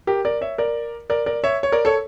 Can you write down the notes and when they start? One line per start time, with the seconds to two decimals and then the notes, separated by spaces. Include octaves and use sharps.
0.07 G4 A#4
0.25 A#4 D5
0.41 C#5 E5
0.58 A#4 D5
1.10 A#4 D5
1.26 A#4 D5
1.44 C#5 E5
1.63 C#5
1.72 A#4 D5
1.85 A4 C#5